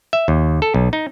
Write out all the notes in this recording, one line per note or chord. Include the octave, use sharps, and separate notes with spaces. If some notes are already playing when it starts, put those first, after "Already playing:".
E5
D#2
A4
B1
D#4